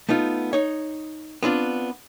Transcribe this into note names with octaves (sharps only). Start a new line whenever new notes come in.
A3 B3 D#4 F4
D#4 C#5
B3 C4 D4 F4